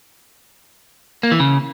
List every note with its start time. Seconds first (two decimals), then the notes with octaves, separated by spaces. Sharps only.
1.23 A#3
1.32 E3
1.40 C#3